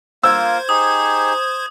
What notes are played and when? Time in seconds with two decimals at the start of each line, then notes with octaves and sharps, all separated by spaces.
0.23 A#3 F4 A#4 C5 E6 G#6
0.69 D#4 G4 G#4 D#6